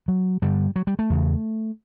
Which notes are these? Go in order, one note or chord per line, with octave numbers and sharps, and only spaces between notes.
F#3
G2 D3 G3
F#3
G3
A3
E2 C#3